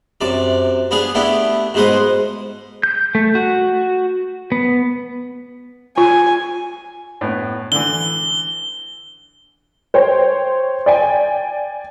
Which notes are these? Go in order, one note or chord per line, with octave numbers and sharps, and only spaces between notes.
F#2 C3 D5
B3 D4 G#4 F5
A3 B3 D4 E4 G4
G#2 B2 G#3 B4 C5 D#6
G6
A3
F#4
B3
F4 G#5
A2 B3
D3 E3 G7
C5 C#5 G5
D5 G5 G#5